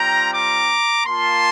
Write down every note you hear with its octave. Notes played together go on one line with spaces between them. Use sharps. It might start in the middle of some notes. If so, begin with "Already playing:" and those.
Already playing: G3 C4 F4 G5 A#5
A#5 D6
A#3 F4 A5 C6